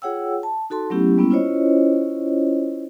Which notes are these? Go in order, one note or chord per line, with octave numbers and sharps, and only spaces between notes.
F4 G#4 C#5 F#5 G5 E6
A5
D#4 F#4 A4 A5 C6
F#3 A3 B3 C#4 E4 G4
G3 A#3 B3 C#4 E4
C#4 E4 F4 C5 C#5 D#5